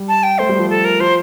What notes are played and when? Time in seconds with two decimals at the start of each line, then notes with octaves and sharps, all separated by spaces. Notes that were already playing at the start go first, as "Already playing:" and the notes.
Already playing: G3
0.08 A5
0.23 G5
0.39 A3 C5
0.49 G3
0.59 F3
0.70 A4
0.85 A#4
1.00 F3 C5